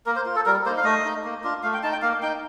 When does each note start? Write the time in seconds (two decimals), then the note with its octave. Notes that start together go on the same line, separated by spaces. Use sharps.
0.06 A#3 A#4
0.16 C5
0.26 F4
0.36 A4
0.46 G3 A#4
0.66 A#3 D#4 C5
0.77 F5
0.84 A3 D#5
1.04 D#4
1.25 A#3
1.44 D4 F4
1.63 A3 F5
1.74 G5
1.83 D#4 A5
1.92 G5
2.02 A#3 F5
2.22 D#4 G5